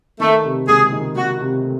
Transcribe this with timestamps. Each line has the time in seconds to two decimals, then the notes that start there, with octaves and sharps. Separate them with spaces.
0.20 D#3 A3
0.45 C3
0.68 C#2 G#4
0.92 D#3
1.16 D#3 F#4
1.41 C3
1.64 A3